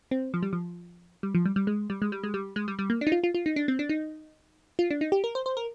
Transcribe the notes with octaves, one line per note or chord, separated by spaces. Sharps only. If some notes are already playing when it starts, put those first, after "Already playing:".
C4
F3
G3
F3
G3
F3
G3
G3
G#3
G3
G#3
G3
G#3
G3
G#3
G3
G3
A#3
D4
D#4
F4
F4
F4
D#4
D4
C4
D4
D#4
F4
D4
D#4
G4
A#4
C5
C5
A#4